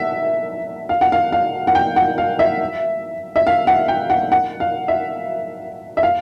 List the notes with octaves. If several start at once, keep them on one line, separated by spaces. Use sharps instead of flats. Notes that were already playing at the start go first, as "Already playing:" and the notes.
Already playing: E5 F#5
F5
F#5
F5
F5
F#5
G5
F#5
F5
E5
E5
F5
F#5
G5
F#5
F#5
F5
E5
E5
F5